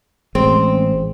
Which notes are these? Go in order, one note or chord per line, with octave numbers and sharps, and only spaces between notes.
A1 G#3 C4